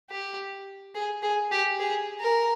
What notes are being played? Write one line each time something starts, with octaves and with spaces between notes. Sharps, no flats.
G4
G#4
G#4
G4
G#4
A#4